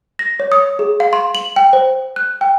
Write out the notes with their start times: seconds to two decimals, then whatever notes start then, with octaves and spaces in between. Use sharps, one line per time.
0.19 A#6
0.40 C#5
0.52 D#6
0.79 G#4
1.00 F5
1.13 C6
1.35 F#7
1.56 G5
1.73 C5
2.16 F#6
2.41 G5